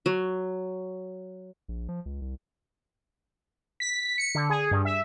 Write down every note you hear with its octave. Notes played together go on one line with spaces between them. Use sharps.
F#3
A#1
F3
C#2
C2
B6
C#7
D3
G#4
G2
E5